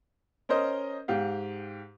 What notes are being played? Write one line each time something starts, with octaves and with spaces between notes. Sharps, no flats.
C#4 A#4 C5 D#5
G#2 G4 F5